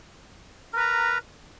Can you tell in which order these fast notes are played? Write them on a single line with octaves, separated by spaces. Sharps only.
A#4 B4 A#5